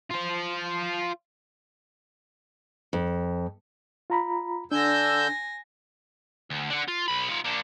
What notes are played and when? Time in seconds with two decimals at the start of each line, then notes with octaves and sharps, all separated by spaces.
0.10 F4 C5
2.93 F2
4.10 F4 A#5 B5
4.72 D3 D4 G#5 E6 G6 A#6
6.50 D2
6.70 D4 F#5
6.88 F4
7.08 B1 B5
7.29 D#4 F4
7.44 A#3 D4